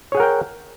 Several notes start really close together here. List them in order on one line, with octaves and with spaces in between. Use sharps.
C#5 G#4 F#5 A#4 G5